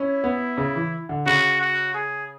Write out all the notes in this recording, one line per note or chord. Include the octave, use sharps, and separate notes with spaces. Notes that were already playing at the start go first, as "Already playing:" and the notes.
Already playing: C#4 E4
B3
C#3
E3
D3
C#3 F#4
F#4
G#4